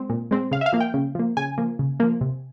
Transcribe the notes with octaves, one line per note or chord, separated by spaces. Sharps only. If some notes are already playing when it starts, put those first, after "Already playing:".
Already playing: G#3 C4
A#2
G#3 C4
C#3 F5
E5
F5
F3 A#3
G5
C#3
F3 A#3
C#3 G#5
F3 A#3
C#3
F3 A#3
C3